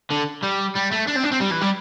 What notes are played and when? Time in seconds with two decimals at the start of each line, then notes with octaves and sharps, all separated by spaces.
0.11 D3
0.43 G3
0.76 G3
0.92 A3
1.08 D4
1.17 C4
1.25 D4
1.33 C4
1.41 G3
1.52 E3
1.62 G3